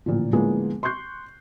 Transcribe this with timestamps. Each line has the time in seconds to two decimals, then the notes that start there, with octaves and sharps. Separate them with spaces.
0.06 A1 A#2 D3 F3
0.33 A2 D3 F3 G#3 A#3 B3
0.83 C6 C#6 F#6 G6 C7